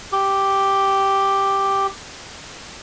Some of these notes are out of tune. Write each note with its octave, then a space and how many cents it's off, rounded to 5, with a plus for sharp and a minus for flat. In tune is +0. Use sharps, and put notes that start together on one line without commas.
G4 +0